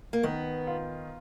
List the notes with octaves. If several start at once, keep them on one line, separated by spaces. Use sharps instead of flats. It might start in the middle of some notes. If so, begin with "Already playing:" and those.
A#3
D#3 B3
F4